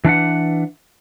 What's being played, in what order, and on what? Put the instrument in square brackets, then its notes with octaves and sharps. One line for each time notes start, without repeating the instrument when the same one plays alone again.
[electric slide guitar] E3 D4 B4 F#5